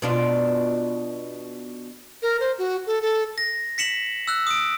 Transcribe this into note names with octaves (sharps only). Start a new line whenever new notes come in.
B2 D4 F4
A#4
C5
F#4
A4
A4
A#6
B6 C#7 E7 F#7
E6 F#6
D#6 D7